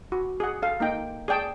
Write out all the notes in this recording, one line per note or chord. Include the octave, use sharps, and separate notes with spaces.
F#4
G#4 F#5
A4 F5
A#3 D#4 G5
G#4 D5 G5 A5